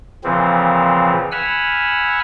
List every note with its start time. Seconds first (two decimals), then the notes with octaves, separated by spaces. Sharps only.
0.24 A#2 C#3 E3 F3 C4
1.32 F#5 G#5 B5 E6 F6